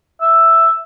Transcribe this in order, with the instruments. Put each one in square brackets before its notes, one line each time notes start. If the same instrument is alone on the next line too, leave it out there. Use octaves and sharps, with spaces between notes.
[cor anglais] E5